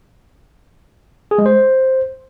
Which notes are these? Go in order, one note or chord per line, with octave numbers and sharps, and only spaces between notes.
G#4
G#3
C5